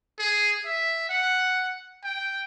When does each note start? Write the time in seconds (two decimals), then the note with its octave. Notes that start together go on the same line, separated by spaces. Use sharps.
0.19 G#4
0.66 E5
1.09 F#5
2.04 G5